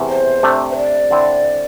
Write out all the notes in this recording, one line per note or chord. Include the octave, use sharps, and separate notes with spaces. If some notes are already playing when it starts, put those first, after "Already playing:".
Already playing: E2 C3 A3
C5
C3 A3 D4
C5
D5
D3 C4 E4